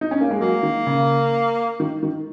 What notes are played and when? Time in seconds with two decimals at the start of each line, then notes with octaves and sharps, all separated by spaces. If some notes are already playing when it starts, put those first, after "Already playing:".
0.01 D#4
0.11 C#4
0.21 A#3
0.31 G#3
0.40 F#3 A#3
0.63 D#3
0.87 C#3
1.80 D#3
2.03 D#3